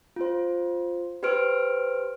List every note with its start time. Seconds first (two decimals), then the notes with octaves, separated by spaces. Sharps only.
0.16 F4 C5
1.23 G4 B4 C5 F6 D7